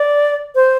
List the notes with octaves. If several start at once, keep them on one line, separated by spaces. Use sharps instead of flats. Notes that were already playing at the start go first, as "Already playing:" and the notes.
Already playing: D5
C5